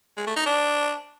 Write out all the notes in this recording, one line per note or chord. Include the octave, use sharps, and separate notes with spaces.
G#3
A3
D#4
D4